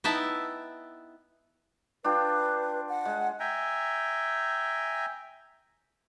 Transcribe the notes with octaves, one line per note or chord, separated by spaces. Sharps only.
B3 D#4 E4 E5 G5 A5
D4 F4 B4 G5
F#5
G#3
E5 G5 G#5 A#5